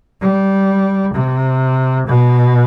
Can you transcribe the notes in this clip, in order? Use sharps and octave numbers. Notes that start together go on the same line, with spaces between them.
G3
C3
B2